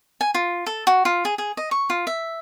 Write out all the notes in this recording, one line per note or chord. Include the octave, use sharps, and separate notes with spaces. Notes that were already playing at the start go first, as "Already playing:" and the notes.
G#5
F4
A4
F#4
F4
G#4
G#4
D#5
C#6
F4
E5